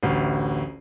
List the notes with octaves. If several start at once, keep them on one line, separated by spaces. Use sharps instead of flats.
A1 D2